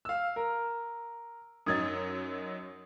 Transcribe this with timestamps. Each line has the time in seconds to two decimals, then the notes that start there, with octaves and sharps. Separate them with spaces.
0.05 F5 E6
0.36 A#4
1.66 F#2 F#3 D#4 D#6 G#6 A6